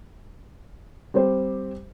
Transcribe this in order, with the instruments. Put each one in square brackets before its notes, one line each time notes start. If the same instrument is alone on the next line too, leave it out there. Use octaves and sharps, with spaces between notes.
[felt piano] G3 C4 G4 C5